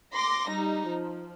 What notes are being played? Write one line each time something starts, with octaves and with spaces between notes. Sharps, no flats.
C6 D6 A#6
G3 D#4
F3